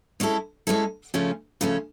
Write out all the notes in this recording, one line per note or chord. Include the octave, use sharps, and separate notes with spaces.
G#3 C#4 E4 A4
G#3 C#4 E4 A4
C#3 F3 A3 C#4
C#3 F3 A3 C#4